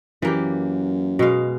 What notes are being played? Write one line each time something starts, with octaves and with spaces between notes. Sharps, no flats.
F#2 E3 A#3 G4
B2 G#3 F5